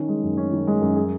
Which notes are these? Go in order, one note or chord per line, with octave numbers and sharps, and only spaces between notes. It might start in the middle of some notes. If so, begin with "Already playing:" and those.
Already playing: D#3 C#4
G#3
F#2
C#4
D#3
G#3
F#2
G#4